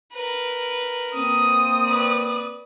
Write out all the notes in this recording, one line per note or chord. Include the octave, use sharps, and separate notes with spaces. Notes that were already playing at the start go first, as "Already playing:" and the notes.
A#4 B4
A#3 C4 D#6
B4 D5